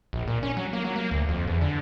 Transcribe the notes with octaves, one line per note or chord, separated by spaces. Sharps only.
A#1
A#2
C#4
F#3
A#3
F#3
A#3
D2
F2
E2
D3